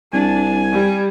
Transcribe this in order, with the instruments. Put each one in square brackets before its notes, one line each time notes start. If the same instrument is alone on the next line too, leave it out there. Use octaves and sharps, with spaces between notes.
[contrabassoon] C2 [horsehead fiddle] D4 [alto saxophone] G#5
[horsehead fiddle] G3